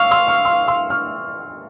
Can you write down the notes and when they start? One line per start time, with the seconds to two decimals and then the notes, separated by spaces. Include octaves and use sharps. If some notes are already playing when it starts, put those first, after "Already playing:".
Already playing: F5 C#6 E6 F6
0.11 C6 E6
0.28 C#6 F6
0.45 C6 E6
0.68 C6 E6
0.90 C#6 F6